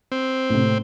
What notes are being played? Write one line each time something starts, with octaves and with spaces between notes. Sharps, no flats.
C4
A2 C3